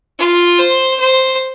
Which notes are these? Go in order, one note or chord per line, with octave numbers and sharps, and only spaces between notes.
F4
C5
C5